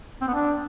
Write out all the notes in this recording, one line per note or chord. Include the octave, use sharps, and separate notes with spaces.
C4
B3
D4